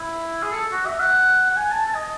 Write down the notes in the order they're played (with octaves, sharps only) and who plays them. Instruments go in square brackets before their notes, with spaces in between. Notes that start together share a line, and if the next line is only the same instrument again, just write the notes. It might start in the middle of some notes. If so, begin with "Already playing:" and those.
Already playing: [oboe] E4
G#4
A4
F#4
E5
F#5
F#5
G#5
A5
A5
D#5